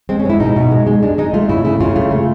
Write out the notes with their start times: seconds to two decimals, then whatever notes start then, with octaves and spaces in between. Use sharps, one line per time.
0.09 G#3 C4
0.20 C#4
0.25 G#3 E4
0.40 B2 D#4
0.56 B2
0.71 G#3
0.87 G#3
1.03 G#3 D4
1.18 G#3 D#4
1.34 A3 F4
1.49 C#3 E4
1.65 C#3 E4
1.80 C#3 F4
1.96 A3 F4
2.11 A3